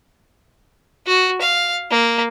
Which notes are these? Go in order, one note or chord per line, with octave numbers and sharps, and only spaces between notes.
F#4
F5
A#3